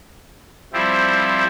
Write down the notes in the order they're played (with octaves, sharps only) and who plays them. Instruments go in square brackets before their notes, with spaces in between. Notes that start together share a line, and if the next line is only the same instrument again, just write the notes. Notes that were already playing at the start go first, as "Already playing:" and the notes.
[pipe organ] F3 G3 C4 E4